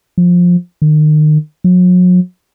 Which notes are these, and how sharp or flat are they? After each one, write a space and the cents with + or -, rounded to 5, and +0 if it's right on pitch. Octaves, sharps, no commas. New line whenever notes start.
F3 +15
D#3 -35
F#3 -40